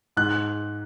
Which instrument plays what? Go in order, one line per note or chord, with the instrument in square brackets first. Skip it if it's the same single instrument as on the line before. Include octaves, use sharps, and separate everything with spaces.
[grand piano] G#2 F#6